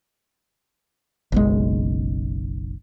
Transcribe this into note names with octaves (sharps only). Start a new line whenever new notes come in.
F#1 B1 G#3